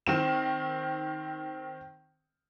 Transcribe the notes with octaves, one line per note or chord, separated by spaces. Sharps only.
D#3 C4 E7